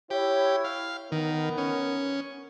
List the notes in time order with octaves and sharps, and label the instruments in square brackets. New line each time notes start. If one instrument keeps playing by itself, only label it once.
[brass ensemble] E4 C#5 [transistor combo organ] G4
[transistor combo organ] F5
[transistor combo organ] D#3 [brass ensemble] B3 A#4
[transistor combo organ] C#4